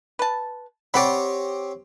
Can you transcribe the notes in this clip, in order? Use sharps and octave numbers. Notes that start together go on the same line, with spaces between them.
B4 A5
C4 G4 C#5 D5 F#5 B5